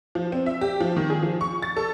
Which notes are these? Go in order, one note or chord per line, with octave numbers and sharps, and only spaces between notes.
F3
C4
E5
G4
F3
D#3
G#4
F3
C#6
A6
A4